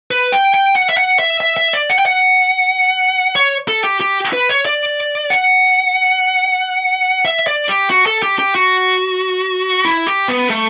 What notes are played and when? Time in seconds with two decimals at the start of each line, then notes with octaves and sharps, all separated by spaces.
0.11 B4
0.32 G5
0.54 G5
0.76 F#5
0.89 E5
0.97 F#5
1.19 E5
1.40 E5
1.57 E5
1.73 D5
1.90 F#5
1.99 G5
2.06 F#5
3.36 C#5
3.68 A4
3.84 G4
4.00 G4
4.33 B4
4.49 C#5
4.65 D5
5.30 F#5
7.25 E5
7.47 D5
7.69 G4
7.90 F#4
8.06 A4
8.23 G4
8.39 G4
8.55 F#4
9.85 E4
10.07 G4
10.28 B3
10.50 A3